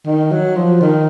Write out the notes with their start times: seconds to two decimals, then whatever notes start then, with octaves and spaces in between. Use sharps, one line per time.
0.06 D#3
0.32 F#3
0.56 F3
0.81 D#3